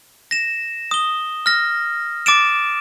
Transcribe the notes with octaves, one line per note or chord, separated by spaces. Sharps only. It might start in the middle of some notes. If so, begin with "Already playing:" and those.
A#6 E7
D#6 G7
F6 A#6
D6 A6 D7 E7